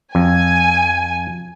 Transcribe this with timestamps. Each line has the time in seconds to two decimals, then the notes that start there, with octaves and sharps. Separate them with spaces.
0.15 F2 G#5